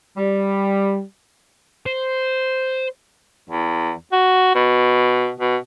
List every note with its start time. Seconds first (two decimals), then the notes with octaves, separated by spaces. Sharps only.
0.17 G3
1.86 C5
3.50 E2
4.12 F#4
4.55 B2
5.40 B2